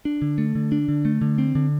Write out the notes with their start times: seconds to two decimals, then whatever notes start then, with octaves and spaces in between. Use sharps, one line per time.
0.05 D4
0.22 D3
0.38 A3
0.55 D3
0.72 D4
0.88 D3
1.05 A3
1.21 D3
1.38 C4
1.55 D3